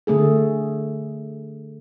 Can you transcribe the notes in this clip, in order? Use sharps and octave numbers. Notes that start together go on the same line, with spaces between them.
D3 A3 G#4 A4